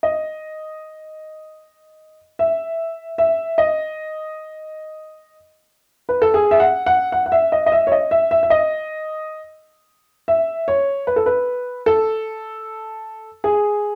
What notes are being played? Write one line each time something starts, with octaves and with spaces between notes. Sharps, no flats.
D#5
E5
E5
D#5
B4
A4
G#4
E5
F#5
F#5
F#5
F#5
E5
D#5
D#5
E5
C#5
D#5
E5
E5
E5
D#5
E5
C#5
B4
A4
B4
A4
G#4